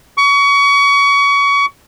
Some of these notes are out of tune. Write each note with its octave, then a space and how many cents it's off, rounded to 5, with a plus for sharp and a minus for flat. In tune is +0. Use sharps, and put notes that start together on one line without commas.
C#6 +30